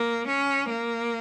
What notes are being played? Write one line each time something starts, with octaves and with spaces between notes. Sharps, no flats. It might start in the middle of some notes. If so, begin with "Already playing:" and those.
Already playing: A#3
C#4
A#3